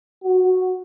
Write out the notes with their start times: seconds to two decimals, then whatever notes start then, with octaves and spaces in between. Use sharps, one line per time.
0.24 F#4